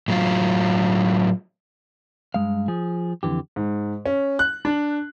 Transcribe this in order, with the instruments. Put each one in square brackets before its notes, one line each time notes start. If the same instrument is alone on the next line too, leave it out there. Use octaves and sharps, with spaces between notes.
[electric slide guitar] A2 F#3 F4
[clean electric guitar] G2 G#3 F5
F3 G#4
F2 A#2 D3 E3 G4
[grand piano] G#2
C#4
F#6
D4